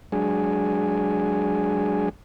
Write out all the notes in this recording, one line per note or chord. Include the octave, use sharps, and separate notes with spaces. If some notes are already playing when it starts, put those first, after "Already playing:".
F#3 G#3 D4 G#4